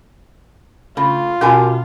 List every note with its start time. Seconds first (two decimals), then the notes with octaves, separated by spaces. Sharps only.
0.97 C#3 A3 F4
1.41 B2 C#4 F#4 G4 A#4 G#5 A5